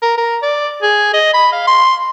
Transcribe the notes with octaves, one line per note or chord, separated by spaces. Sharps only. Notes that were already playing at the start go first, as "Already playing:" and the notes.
A#4
A#4
D5
G#4
D#5
B5
F5
C6